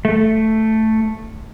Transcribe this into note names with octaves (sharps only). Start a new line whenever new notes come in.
A3